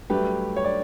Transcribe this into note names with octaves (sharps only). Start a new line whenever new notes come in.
G2 F#3 A3 D4 G4 B4
C#5
D5